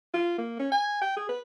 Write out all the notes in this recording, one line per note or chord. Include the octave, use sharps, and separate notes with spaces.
F4
A#3
C#4
G#5
G5
G#4
B4